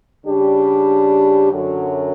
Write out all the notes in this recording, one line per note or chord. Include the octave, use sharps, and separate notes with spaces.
C#3 G3 D4 G4
F#2 D3 F#3